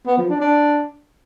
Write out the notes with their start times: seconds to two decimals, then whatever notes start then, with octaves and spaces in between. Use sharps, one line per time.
0.07 B3
0.18 F3
0.29 D4
0.40 D4